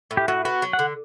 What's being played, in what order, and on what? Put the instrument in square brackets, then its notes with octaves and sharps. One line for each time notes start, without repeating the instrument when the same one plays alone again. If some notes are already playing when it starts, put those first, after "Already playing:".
[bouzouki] A2
[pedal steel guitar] G4
[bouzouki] A2 [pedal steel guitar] F#4
[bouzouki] B3 [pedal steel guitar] F#4
[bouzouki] F#3
[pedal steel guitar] F#5
[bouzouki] D3